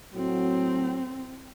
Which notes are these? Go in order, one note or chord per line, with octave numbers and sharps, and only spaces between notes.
A2 F#3 C4